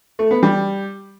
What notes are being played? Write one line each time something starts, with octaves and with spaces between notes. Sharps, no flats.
A3
B3
G3